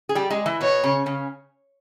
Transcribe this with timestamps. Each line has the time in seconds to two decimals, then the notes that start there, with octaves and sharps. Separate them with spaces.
0.09 G#4
0.15 G3 G4
0.30 G#3 G#4
0.46 E3 E4
0.61 B2 B3 C#5
0.83 C#3 C#4
1.06 C#3 C#4